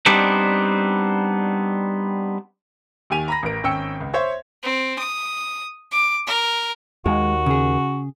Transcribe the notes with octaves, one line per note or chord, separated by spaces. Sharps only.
G3 B3 C4 D4 D#4
D#2 D#3 G4 G#5 D#7 F7
A#5 B5 A#6
A1 A#4 D7
G#1 C#4 G5 E6 C#7
C#2
C5 C#5 E5 G#6
C4
D#6
D6
A#4
D#2 G#3 F#4
C#3 G#4